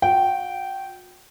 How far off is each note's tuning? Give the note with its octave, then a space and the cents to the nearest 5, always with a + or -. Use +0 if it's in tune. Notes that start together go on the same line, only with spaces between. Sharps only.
F#4 -40 G5 -15